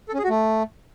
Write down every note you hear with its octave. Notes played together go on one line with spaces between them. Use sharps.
A4
C#4
G#4
F#4
A3